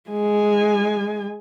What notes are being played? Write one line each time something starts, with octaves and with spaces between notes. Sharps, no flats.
G#3 G#5